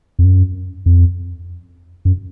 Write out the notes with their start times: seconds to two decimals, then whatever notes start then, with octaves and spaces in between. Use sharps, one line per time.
0.19 F2
0.24 F#2
0.86 F2
2.05 F#2